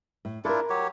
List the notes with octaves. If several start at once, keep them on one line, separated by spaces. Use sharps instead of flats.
A2
D4 E4 F4 A4 A#4
F#3 G4 C#5